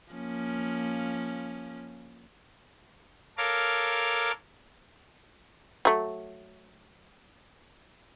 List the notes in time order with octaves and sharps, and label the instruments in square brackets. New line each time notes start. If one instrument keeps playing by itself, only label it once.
[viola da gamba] F3 A#3 C#4
[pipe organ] A4 A#4 C#5 F5 D6
[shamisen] F#3 A3